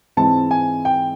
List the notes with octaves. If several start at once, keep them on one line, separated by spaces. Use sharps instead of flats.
G#2 E3 G#3 C4 E4 A5
G#5
G5